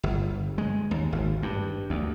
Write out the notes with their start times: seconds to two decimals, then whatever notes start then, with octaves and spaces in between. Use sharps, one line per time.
0.03 G1
0.58 G#3
0.91 D#2
1.12 G#1
1.43 G2
1.90 D2